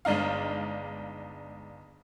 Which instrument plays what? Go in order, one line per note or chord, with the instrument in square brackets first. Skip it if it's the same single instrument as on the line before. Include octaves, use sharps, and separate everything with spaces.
[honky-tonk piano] G1 G#3 D4 D#4 F5